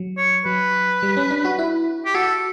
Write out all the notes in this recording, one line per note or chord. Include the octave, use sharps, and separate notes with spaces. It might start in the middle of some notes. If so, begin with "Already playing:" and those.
Already playing: F#3
C#5
F#3 B4
G3
C#4
D4
F#4
E4
G4
F#4 A4